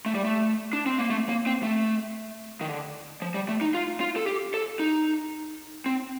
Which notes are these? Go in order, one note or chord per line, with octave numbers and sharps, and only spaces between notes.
A3
G3
A3
D4
C4
A#3
A3
A#3
C4
A3
D#3
D3
F3
G3
A3
D#4
F4
F4
A4
G4
A4
D#4
C4